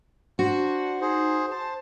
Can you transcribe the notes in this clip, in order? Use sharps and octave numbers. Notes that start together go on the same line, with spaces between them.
D4 F#4 C5
D#4 G#4 C5
C5 A5